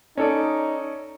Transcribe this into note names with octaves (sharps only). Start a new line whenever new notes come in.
C#4 D#4 A4 D5